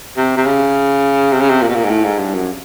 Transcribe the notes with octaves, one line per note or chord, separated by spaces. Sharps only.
C3
C3
C#3
C3
C#3
C3
A#2
B2
A#2
G#2
A2
G#2
G2
F#2